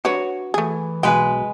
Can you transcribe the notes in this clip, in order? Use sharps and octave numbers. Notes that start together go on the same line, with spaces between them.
D4 F#4 B4 C#5
E3 A3 G#4
B1 G#3 B4 G5 G#5